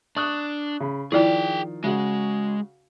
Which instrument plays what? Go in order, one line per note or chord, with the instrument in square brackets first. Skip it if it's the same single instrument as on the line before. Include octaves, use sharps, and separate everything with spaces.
[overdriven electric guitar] D4 [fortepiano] C#6 D#6 F#6
[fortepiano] C#3 B5
[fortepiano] D#3 F3 [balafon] E4 D5 [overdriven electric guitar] G#4 G5
[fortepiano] C#3 F#4 [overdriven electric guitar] G#3